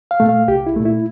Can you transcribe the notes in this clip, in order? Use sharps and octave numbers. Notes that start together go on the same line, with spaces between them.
F5
A#2 A3
F5
C2 G4
E4
A#2 A3
E4